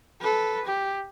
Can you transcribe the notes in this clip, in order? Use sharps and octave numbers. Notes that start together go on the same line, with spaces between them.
A4 B4
G4